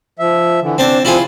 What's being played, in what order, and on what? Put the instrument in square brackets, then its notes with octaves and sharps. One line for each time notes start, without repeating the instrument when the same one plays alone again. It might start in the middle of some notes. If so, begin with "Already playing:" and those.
[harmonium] F3 E5
D3 E3
[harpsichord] C4 A5 [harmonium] D4
[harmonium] F3 C4 [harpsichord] E4 F4 G#4